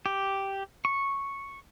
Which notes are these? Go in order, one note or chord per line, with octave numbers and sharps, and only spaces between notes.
G4
C#6